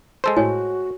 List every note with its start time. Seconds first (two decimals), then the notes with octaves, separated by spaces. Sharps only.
0.24 G#3 A4 C5
0.37 A2 F#4 C#5 G#5